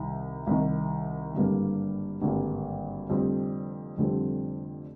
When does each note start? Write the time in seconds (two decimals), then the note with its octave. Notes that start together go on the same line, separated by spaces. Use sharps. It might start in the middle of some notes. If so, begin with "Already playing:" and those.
Already playing: C2 C3 D#3
0.47 C2 C3 D#3
1.35 G#1 G2 D3 G3 A#3
2.22 G#1 G2 D3 G3 A#3
3.09 F1 F2 D3 G3 C4
3.97 F1 F2 D3 G3 C4